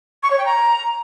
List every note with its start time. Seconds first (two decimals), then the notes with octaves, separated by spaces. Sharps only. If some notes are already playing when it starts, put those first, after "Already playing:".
0.23 C#6
0.30 C#5
0.38 G5
0.45 A#5